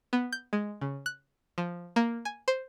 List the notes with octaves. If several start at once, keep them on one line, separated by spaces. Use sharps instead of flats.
B3
G6
G#3
C#3
F#6
F3
A#3
G#5
C5